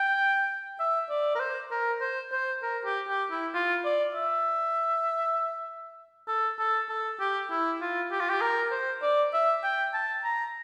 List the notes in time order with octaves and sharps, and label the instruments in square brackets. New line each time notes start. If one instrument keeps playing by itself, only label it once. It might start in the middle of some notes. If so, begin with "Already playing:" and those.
Already playing: [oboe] G5
E5
D5
A#4
C5
A#4
C5
C5
A#4
G4
G4
E4
F4
D5
E5
A4
A4
A4
G4
E4
F4
G4
F4
G4
A#4
C5
D5
E5
G5
A5
A#5